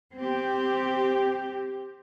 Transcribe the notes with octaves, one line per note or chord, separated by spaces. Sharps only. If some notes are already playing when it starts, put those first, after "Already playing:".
C4 G4